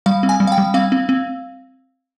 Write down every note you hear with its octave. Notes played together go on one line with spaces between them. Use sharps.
G3 F5
C4
G#5
G3
F5
G5
G3
C4 F5
C4
C4